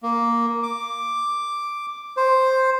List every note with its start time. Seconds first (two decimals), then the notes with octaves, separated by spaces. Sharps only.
0.03 A#3
0.63 D6
2.17 C5